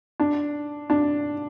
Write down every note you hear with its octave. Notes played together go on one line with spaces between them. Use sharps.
D4
D4